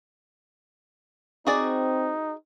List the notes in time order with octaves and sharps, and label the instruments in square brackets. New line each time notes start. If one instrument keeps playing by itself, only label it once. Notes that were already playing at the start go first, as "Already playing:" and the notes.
[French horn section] C4 [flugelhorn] D#4 [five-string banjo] F#4 G#4 D5